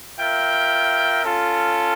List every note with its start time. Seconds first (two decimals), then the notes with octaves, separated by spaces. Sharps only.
0.19 F4 A#4 E5 G5
1.24 C#4 F4 A4